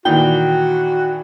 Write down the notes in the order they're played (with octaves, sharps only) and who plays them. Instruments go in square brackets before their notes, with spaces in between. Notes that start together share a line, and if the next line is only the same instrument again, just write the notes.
[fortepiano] A#2 D#3 E3 [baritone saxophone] F#4 [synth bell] G5